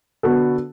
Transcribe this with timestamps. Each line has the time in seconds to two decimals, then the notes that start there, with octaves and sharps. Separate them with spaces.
0.23 D3 B3 F#4 A4